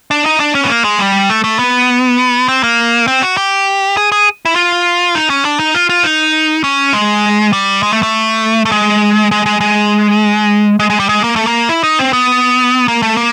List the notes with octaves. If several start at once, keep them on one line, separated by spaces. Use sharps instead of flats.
D4
D#4
D4
C#4
B3
A#3
G#3
G3
A3
A3
B3
C4
A#3
C4
F#4
G4
G#4
G#4
E4
F4
D#4
C#4
D4
D#4
F4
F4
D#4
C#4
G#3
G3
G#3
A3
A3
A3
G#3
G#3
G#3
G#3
G#3
G#3
G3
G#3
A#3
A3
A#3
E4
D#4
C4
B3
A#3
A3
A#3